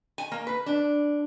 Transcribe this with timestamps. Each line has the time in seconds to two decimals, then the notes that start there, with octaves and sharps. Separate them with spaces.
0.18 G#5
0.32 A#3
0.47 B4
0.66 D4